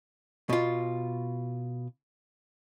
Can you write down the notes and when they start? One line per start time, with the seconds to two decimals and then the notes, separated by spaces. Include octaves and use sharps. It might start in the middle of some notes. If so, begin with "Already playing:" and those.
0.49 B2 F4